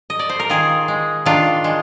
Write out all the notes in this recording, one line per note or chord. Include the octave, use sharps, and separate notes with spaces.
D#5
D5
C5
A#4
D#3 F4 G#4
G#3
D#3 D4 F4
G#3